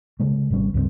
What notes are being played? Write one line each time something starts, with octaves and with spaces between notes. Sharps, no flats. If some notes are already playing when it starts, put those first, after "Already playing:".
C#3 G#3 A3
G#1 C3 G3 C#4
C#2 G2 G#3 C4